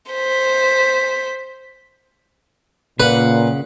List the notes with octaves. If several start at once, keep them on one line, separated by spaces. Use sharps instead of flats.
C5 B6
A#2 C#3 B4 F#5